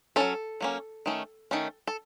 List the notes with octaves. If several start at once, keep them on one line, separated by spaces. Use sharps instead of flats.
F#3 A#3 C#4 A4
F#3 A#3 C#4
D#3 A3 C#4
D#3 A3 C#4
A4